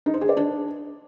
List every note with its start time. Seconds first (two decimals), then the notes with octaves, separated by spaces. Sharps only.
0.06 D#4
0.14 C5
0.21 G#4
0.29 D5
0.37 D4